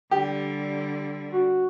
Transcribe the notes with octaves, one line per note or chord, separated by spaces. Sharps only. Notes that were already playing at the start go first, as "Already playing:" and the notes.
D3 G3 G4
F#4